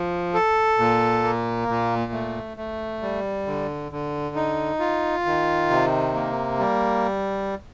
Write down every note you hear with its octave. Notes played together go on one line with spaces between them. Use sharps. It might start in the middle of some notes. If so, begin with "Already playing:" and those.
Already playing: F3
A4
A#2
A#3
A#2
A3
A3
G3
D3
D3
D#4
F4
D#3
C3
A#3
G3